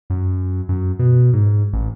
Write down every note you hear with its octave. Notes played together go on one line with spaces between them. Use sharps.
F#2
F#2
B2
G#2
A1